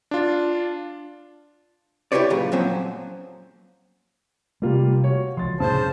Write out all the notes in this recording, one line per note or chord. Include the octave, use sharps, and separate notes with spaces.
D4 F4
E4 G4 A#4 B4 C#5 D5
F#2 A#2 C#3
F2 A#2 F3 F#3 C4 C#4
C3 G3 A3 A#3 F4
F#4 C#5
C#2 F3 C6 A6
F1 A2 C#3 C5 A5 G6